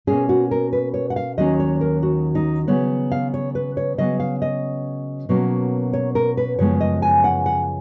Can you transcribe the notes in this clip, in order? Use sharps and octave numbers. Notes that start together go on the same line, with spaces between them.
B2 A#3 C#4 G#4
F#4
A#4
B4
C#5
F#5
F5
D#2 D#3 F#3 A#3 C#4 D#5
C#5
A#4
F#4
D#4
C#3 F#3 B3 C#5
F5
C#5
B4
C#5
C#3 F#3 B3 D#5
F5
D#5
B2 F#3 A#3 C#4
C#5
A#4
B4
F#2 C#3 F3 G#3 B3 C#5
D#5
G#5
F#5
F#5